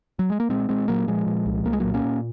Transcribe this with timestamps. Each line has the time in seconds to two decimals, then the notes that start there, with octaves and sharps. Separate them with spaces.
0.19 F#3
0.30 G#3
0.40 A#3
0.49 A#2 G#3 C4
0.69 A#2 G#3 C4
0.88 A#2 F#3 A#3
1.07 A#2 F3 G#3
1.26 A#2
1.46 C2
1.65 C2 A#3
1.73 G#3
1.80 A#2 F#3 A#3
1.94 A#3 C#4
2.04 A#2